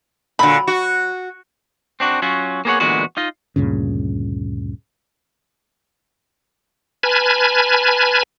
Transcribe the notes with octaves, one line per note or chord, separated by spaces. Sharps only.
A#2 D3 F#3 B5
F#4
C4 D4 F#4
F#3 C#4 F4 F#4
A#3 B3 G#4 A#4 C#5 F#5
E2 A#2 D3 G#3 B3 F#4
D#4 F4 D#5
D2 G2 A#2 C#3
B4 G#5 A5 B5 F6 G#6